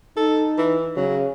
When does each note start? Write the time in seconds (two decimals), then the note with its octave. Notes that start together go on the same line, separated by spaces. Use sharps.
0.17 D#4 A4
0.58 E3
0.96 C#3 F#3